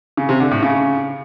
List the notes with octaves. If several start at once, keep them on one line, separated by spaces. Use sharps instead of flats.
C#3
C3
D3
A2
C#3